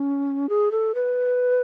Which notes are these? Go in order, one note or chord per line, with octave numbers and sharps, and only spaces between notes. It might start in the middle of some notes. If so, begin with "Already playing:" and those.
Already playing: C#4
G#4
A4
B4